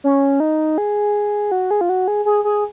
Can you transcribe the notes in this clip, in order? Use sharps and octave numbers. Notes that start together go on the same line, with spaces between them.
C#4
D#4
G#4
F#4
G#4
F4
F#4
G#4
G#4
G#4